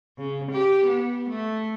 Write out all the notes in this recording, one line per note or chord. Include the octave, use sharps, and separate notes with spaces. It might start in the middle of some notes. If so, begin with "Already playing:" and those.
C#3
G4
B3
A3